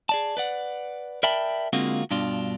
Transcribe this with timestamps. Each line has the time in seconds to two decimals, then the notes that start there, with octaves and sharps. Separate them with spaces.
0.09 G#4 D5 A5
0.37 B4 D5 F#5
1.23 A#4 D5 E5 G5 A5 B5
1.73 D3 G#3 A#3 C4 F4 F#4
2.11 G2 B2 D4 F4